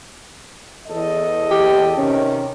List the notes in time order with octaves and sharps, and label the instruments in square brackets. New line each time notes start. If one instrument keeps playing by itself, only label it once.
[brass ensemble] E2 A4 D#5
[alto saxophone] G4
[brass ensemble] C3 D#3 [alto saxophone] C#4